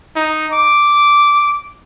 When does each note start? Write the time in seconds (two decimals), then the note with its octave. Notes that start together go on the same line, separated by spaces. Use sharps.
0.16 D#4
0.53 D6